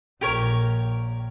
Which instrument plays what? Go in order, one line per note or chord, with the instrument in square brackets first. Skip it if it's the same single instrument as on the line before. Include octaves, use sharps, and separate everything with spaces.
[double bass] A#1 [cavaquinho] G4 A#4 C#5